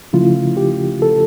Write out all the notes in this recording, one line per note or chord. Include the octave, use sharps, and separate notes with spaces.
C#3 F3 A3 C#4 E4 F4
G4
A4